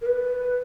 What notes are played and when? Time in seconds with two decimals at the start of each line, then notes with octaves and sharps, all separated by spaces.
0.01 A#4
0.06 B4